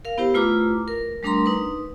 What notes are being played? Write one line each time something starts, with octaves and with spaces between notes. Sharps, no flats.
A#4 F5
B3 E4 G4 C5
A3 E4 F4 B4 A#5 D6
A#4
G3 A3 D4 A#4 A#5 C6
D#4 B4